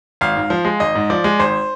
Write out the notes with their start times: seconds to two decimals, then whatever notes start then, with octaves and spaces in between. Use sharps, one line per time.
0.21 G#1 F5
0.36 G#2
0.50 F3
0.65 G#3
0.80 G#1 D#5
0.95 G#2
1.10 F3 D5
1.24 G#3
1.39 G#1 C5